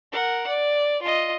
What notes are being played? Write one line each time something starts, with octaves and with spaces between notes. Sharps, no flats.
A#4 F#5
D5
F4 D#5